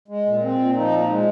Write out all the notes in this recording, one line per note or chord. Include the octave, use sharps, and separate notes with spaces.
G#3
A#2
C4
A#2
F3 D#4
A#2
G#3